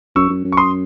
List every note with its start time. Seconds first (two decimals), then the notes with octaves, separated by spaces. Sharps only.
0.16 F#2 C#6 E6
0.29 F#2
0.44 F#2
0.52 C#6
0.57 C6 D#6